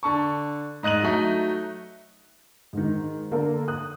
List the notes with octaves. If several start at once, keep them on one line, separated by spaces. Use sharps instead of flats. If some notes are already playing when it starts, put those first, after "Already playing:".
D3 A5 C#6
G#2 D#5 F#6 D#7 F#7
F#3 A3 D#4
G#2 D#3
D3 A#3 A4 A#4
D#6 F#6